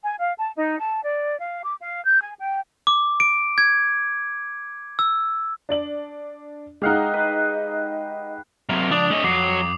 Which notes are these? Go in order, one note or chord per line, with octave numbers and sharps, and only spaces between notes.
G#5
F5
A5
D#4
A5
D5
F5
D6
F5
G6
G#5
G5
D6
D7
G#6
E6
D4 D5 F#7
G#3 D#4 G4 D#5 F5 F#5
B4
C3 F#3 A#3 F7
C#2 F3 D4 D6 D#6 F7
A3 D4 C#5 D#5
F2 F#3 D6 C7